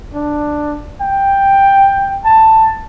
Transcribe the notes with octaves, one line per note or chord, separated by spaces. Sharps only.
D4
G5
A5